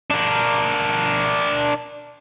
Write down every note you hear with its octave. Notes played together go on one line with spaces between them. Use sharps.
D4 A#4